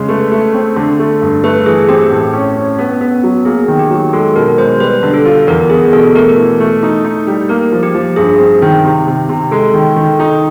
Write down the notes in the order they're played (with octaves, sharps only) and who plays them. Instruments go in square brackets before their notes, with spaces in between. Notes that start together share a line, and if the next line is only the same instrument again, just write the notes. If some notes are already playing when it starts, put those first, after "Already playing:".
Already playing: [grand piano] C#3 G#3
[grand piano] A3 [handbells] B4
[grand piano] A3
C4
D3
A3
G2
[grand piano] A3 [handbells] B4
[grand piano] E3 [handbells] G#4
[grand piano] C4 [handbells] G4
[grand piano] A2
C#4
C#4
B3
B3
F#3
[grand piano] A#3 [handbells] G#4
[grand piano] D#3
[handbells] G4
[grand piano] F#3
[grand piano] G#3 [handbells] A4
[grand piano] B2 [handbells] A#4
[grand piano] G#3 [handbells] C5
[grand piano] G3 [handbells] B4
[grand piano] D3
[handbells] A4
[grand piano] F4
[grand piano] E2 [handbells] A#4
[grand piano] B3 [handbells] G#4
[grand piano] B2 [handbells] A4
[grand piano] A3 [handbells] A#4
[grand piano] E3
A3
D#4
D#4
G3
[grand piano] A#3 [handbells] A#4
[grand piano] F3
[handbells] G4
[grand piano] F3
[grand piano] G2 [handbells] G#4
[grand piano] C4
D#3
C3
C3
C3
[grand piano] G#3 [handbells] A4
[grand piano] D#3
D#3
D#4